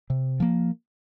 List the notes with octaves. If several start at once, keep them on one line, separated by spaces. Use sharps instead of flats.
C3
F3 A#3